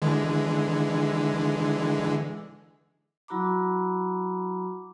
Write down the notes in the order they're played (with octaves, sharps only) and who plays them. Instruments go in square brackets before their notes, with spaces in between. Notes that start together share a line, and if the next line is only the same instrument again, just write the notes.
[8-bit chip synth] D3 E3 G#3
[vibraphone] F#3 E4 F#4 A#5 B5 D6